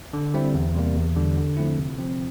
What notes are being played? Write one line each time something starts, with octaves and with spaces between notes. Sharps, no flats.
D3
G3 C4 E4
E2
C3 G3 A#3
E2
D3 G3
D3
F3 A3 C4 E4
C3
F3 C4